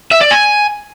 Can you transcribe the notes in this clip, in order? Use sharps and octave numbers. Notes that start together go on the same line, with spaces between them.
E5
D5
G#5